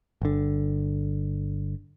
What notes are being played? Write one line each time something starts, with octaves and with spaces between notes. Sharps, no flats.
G1 D3